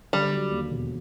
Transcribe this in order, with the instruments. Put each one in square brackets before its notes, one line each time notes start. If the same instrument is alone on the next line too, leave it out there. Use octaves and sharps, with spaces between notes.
[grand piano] D3 [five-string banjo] G3
[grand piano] F#3
D#2
E1